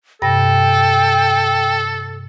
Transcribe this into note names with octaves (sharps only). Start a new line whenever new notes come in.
G2 C3 A4 G5 A#6